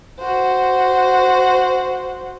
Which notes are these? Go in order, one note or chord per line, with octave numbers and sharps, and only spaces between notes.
F#4 C5